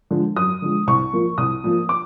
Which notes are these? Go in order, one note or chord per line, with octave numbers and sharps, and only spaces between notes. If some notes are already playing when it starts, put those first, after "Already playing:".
D3 F3 G#3
F#2 D#6
D3 F3 G#3
C2 C#6
A#2 F3 A#3
C2 D#6
A#2 F3 A#3
D6